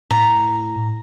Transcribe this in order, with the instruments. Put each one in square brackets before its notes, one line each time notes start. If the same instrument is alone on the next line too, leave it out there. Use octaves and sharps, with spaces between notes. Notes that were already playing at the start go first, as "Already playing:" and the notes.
[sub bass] A2 [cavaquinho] A#5